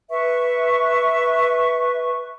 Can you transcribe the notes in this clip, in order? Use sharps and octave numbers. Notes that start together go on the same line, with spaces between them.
B4 E5 C#6